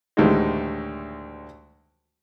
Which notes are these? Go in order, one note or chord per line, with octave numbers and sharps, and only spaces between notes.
D2 A2 D#3 E3 G3 G#3